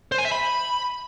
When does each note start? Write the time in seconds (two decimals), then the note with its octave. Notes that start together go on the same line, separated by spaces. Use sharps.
0.12 C5
0.18 G#5
0.25 E5
0.31 B5